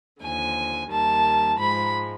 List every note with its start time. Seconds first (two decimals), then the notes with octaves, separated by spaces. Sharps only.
0.21 D#2 D3 F3 G#5
0.90 D#2 D#3 G3 A5
1.58 G#2 F3 G#3 B5